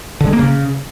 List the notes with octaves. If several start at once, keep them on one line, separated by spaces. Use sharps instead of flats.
D3
G#3
A#3
C#3